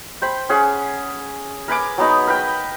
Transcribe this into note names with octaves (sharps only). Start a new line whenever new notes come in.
C5 G5 B5
C#4 G#4 F#5
A#4 B4 G#5 D6
F#3 B3 D#4
A#4 B4 G5